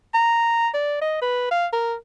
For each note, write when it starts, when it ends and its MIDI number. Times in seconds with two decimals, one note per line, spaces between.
0.14 0.68 82
0.74 0.99 74
1.01 1.19 75
1.22 1.47 71
1.51 1.67 77
1.73 1.95 70